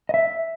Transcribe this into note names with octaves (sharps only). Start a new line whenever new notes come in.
D#5
E5